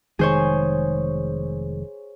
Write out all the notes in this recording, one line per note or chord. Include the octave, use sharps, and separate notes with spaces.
F1 D#3 G#3 G#4 C5 C#5